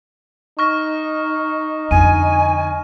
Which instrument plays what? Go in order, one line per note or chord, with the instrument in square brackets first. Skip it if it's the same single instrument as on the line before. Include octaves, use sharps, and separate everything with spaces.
[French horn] D#4 [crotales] C#6 F6 A#6
[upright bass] F2 D3 [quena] G#5 [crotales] D#7